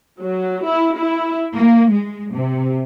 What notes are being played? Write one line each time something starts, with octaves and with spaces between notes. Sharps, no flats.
F#3
E4
E4
A#3
G#3
C3